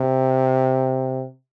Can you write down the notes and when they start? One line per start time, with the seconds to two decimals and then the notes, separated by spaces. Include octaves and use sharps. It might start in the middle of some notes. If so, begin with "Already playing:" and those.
Already playing: C3